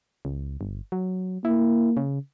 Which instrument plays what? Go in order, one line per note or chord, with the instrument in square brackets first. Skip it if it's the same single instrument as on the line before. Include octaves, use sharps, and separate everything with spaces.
[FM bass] C#2
G1
F#3
[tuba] A#3 [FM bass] E4
[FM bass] C#3